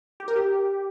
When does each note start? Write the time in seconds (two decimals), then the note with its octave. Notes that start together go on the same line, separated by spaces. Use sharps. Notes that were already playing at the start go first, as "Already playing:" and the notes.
0.20 G4
0.28 A#4
0.36 G4